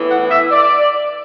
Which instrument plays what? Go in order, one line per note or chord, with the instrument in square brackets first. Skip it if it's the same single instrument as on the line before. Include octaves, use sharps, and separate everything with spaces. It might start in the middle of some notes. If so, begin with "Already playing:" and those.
Already playing: [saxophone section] A2 E3 B3
F#5
E5
D5